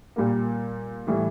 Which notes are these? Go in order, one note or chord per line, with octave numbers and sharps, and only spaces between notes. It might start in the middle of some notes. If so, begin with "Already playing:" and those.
A#2 G3 A#3
A2 E3 G3